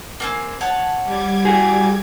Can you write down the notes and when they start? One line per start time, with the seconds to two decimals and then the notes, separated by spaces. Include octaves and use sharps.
0.20 A#3 C4 G#4
0.61 C#5 F#5 A5
1.04 G3 D6 G#6
1.45 F#4 G#4